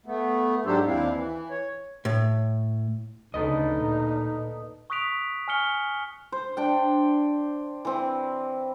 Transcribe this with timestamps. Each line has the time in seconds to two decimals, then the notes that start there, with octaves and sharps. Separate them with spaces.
0.06 A3 B3
0.66 G#2 F#3 D4 G4 A4 C5
0.87 D#2 C4 D4 E4 F5
1.14 E3
1.51 C#5
2.05 A2
3.34 D2 C#3 D#4 A4 B4 D#5
3.76 A#2
4.90 C#6 D#6 F#6 B6 D7 F7
5.48 G#5 C#6 F6 C#7 G7
6.32 C5
6.57 D4 G5
7.85 E3 C4